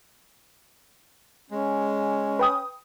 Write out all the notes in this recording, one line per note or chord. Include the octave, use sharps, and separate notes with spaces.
G#3 C#4
B4 G5 D#6